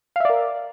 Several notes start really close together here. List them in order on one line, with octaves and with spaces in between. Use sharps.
F5 E5 D5 A#4